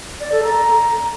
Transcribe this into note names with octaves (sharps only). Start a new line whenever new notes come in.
D5
A4
A#5